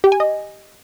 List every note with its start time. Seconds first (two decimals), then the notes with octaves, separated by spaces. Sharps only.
0.04 G4
0.12 G#5
0.20 D#5